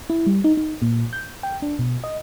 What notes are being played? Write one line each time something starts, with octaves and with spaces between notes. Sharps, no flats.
E4
G3
D#4
D#4
A#2
G6
G5
D4
B2
D#5